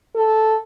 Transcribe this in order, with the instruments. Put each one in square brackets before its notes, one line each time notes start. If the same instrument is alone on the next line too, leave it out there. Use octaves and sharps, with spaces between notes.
[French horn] A4